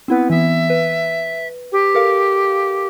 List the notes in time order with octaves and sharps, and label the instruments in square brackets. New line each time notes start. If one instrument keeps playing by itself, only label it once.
[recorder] B3 [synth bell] C4 E4 B4
[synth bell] E3 B3 [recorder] E5
[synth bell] B4
[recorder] G4
[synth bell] A4 A#4 F5